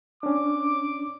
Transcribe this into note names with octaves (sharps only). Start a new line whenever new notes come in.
C#4 D4 D6